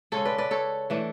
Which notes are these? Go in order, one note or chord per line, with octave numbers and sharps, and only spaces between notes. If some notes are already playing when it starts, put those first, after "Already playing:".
C#3 G#3 C#4 A4 C#5
B4 D5
B4 D5
A4 C#5
E3 A3 D4